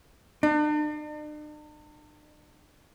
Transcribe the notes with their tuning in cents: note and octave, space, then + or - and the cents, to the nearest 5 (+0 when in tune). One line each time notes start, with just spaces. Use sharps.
D4 +45